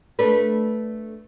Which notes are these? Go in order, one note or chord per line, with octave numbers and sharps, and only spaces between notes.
A3 D4 B4